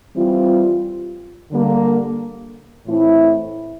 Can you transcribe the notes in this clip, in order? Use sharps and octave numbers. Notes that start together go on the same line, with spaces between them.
E3 G3 C4 F4
D3 G3 A#3
A2 E3 A3 C4 E4